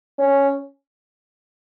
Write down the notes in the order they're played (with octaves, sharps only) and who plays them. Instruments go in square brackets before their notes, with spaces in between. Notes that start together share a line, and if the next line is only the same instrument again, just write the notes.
[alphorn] C#4